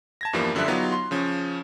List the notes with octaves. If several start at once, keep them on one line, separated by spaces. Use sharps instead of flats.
A5 G#6 A#6
E2 G2 E3 F3 G3 A#3
F#2 D3 F3 G3 E5 F#6
F#3 B3 D#4 F4 G4
C6
C#3 F3 C#4